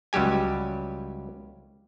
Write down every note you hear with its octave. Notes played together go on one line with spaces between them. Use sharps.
C#2 F#3 G3 G4 G#5